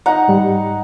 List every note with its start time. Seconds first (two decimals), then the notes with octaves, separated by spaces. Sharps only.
0.06 D#4 F#5 A#5
0.28 G#2 G3